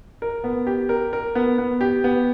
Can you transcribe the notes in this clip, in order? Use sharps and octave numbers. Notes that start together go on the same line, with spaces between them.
A#4
B3
G4
A#4
A#4
B3
B3
G4
B3